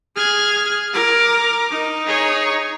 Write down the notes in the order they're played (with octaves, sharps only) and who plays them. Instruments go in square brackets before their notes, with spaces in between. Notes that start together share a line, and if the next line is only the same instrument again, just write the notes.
[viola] G#4 [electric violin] F6 G#6
[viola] A#4 [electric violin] D6
[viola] D#4
[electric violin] G#4 C#5